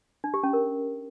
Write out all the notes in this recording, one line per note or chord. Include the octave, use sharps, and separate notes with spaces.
D4
G4
C#4
A#4